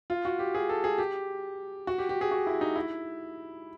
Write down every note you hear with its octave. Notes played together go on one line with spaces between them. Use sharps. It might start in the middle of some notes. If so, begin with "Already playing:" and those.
F4
F#4
G4
G#4
A4
G#4
G4
F#4
G4
G4
G#4
F#4
E4
D#4
E4